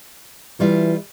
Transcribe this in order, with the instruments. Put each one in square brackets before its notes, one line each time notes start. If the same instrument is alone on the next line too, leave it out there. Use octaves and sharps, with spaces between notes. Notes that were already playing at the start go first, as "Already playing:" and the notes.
[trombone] E3 [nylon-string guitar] G3 F4 E5